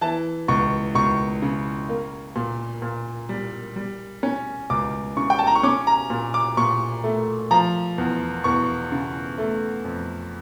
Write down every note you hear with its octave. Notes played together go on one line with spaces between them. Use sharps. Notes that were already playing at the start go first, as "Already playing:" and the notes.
E3 A5
C#2 C#6
C#2 C#6
C#3
A#3
A#2
A#2
G3
G3
C#4
C#2 D6
C#3 C#6
G5
A5
A#5
C#6
C#4 D6
A#5
A#2
D6
A#2 C#6
A3
F3 A#5
E2
E2 C#6
C#3
A3
F2